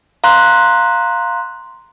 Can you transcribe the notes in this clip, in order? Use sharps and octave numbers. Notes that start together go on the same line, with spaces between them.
F5 A#5 C6 F#6